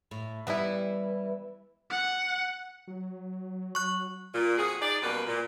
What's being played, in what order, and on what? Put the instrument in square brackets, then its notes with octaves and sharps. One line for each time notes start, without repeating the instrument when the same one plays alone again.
[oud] A2
[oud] E3 G3 [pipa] B3 E4
[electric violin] F#5
[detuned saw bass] F#3
[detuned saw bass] F#3 [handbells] C#6 F#6
[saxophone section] A#2
F2 F#4 G#4
D#4 G#4 D5
F#2 B2 G3 A#3 B4
A#2